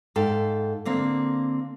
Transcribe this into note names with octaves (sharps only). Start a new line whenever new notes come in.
G#2 A4 F5 G5
D3 A#3 C4